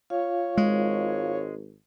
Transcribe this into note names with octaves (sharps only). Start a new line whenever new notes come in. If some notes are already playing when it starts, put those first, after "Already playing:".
F4 C#5 F5
G#1 G#3